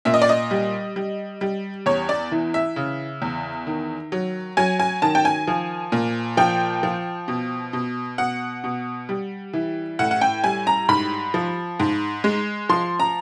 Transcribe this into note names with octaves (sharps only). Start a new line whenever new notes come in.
A#2 E5
D#5
D5
D#5
G3
G3
G3
E2 C#5
D5
E3
E5
C#3
E2
D#3
F#3
F#3 G#5
G#5
D#3 A5
G5
G#5
F3
A#2
F3 G5
F3
B2
B2
B2 F#5
B2
G3
E3
A2 F#5
F#5
G5
G3 G#5
A#5
G#2 B5
F3
G#2
G#3
F3 C6
A#5